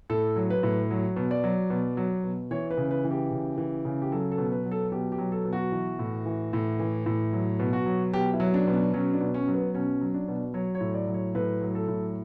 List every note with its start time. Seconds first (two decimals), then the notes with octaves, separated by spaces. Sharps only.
0.10 A2 A4
0.36 F#3
0.50 B4
0.63 A2
0.91 F#3
1.16 B2
1.31 D5
1.44 F#3
1.70 B2
1.97 F#3
2.24 B2
2.51 E3 C#5
2.70 B4
2.77 C#3
2.91 B4
3.04 E3
3.11 G4
3.31 C#3
3.58 E3
3.85 C#3
4.02 G4
4.12 F#3 A4
4.32 A4
4.38 B2
4.52 B4
4.66 F#3
4.71 A4
4.92 B2 G4
5.12 G4
5.18 F#3
5.32 A4
5.45 B2
5.53 F#4
5.72 E3
5.99 A2
6.26 E3
6.53 A2
6.80 E3
7.06 A2
7.33 F#3
7.59 B2
7.73 F#4
7.86 F#3
8.13 B2 G4
8.34 E4
8.40 F#3
8.54 D4
8.67 B2
8.73 D4
8.94 F#3 C#4
9.14 D4
9.21 B2
9.34 C#4
9.48 F#3
9.54 B3
9.74 B2 C#4
10.01 F#3
10.14 D4
10.28 B2
10.54 F#3 C#5
10.75 C#5
10.81 A2
10.94 D5
11.07 F#3
11.14 C#5
11.35 A2 B4
11.61 F#3
11.75 A4
11.88 A2